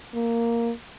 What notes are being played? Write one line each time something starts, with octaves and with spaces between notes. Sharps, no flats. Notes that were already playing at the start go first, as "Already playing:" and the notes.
A#3